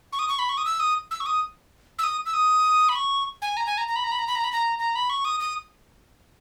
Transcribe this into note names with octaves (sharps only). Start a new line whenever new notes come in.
C#6
D#6
C#6
B5
C#6
D#6
E6
D#6
E6
C#6
D#6
E6
D#6
E6
D#6
B5
C#6
G#5
A#5
G#5
A#5
A#5
B5
A#5
B5
A#5
B5
A#5
B5
A#5
A#5
B5
C#6
D#6
D#6